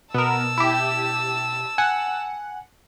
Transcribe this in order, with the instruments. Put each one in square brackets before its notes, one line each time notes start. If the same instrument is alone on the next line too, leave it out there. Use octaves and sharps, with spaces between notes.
[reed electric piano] B2 [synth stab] B3 A#4 [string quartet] A5 E6
[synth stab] E4 G4
[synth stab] F#5 [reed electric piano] G#5